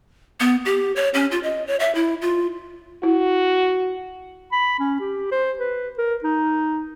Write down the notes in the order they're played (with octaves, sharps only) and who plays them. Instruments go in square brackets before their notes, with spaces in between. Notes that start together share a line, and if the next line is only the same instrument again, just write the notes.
[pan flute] B3
G4
C#5
C#4
F4
D#5
C#5
E5
E4
F4
[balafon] E4 [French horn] F#4
[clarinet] B5
C#4
G4
C5
B4
A#4
D#4